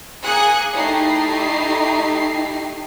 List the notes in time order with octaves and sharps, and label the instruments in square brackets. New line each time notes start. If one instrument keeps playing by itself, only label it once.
[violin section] A#3 G#4 G#5 D#6 F#6 C#7
A3 D#4 E4 G4 C7